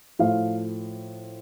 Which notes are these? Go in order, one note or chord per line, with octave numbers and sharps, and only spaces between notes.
A2 F3 A3 F5